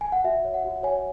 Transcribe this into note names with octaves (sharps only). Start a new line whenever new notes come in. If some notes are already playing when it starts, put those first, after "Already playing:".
G#5
F#5
F#4 E5
C#5
F#5
F#4
C#5 G#5